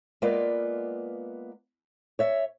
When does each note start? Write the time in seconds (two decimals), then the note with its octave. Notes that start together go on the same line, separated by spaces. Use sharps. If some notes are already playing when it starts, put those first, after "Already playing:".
0.22 G#3 A#3 B3 F4 B4 D5
2.19 C#5 E5